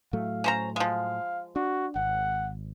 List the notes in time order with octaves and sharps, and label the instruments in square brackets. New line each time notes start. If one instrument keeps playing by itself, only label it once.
[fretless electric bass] A2 F#3 A3 [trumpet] F5
[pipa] C#4 C5 A#5
[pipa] F3 G#3 [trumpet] F5
[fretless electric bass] D4 [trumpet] F#4
[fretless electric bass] G#1 [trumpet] F#5